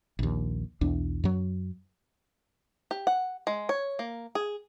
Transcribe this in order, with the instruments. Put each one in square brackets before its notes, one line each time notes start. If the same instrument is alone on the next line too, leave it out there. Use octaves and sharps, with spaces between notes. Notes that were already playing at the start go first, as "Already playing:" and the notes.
[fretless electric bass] A#1 D#2
B1 E2 D4
F#2 F#3
[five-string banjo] G4
F#5
G#3
C#5
A#3
G#4